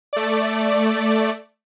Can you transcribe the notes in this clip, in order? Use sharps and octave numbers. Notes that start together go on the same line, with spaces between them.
A3 D5